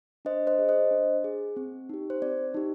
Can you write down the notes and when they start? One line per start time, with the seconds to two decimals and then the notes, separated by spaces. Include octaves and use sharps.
0.25 D4 C5 D#5
0.47 C5 D#5
0.59 G#4
0.69 C5 D#5
0.91 D4
1.24 G#4
1.56 C4
1.89 D#4 G4
2.10 C5
2.22 C4 D5
2.54 D#4 G4